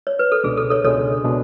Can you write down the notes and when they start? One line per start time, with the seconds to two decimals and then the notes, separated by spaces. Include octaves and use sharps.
0.07 C#5
0.19 B4
0.32 A4
0.44 C#2 B2 G#3 D4 G#4
0.57 A4
0.70 A4 C#5
0.84 C#2 B2 G#3 D4 A4 C#5
1.25 B2 G#3 D4